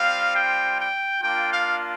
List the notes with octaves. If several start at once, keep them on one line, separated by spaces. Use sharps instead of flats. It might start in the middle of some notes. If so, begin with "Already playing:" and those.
Already playing: G3 C4 F4 F5
G5
G5
A#3 D4 F4 G5
F5